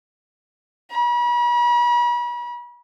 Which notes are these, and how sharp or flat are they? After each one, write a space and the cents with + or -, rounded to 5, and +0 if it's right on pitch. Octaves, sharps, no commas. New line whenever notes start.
B5 -40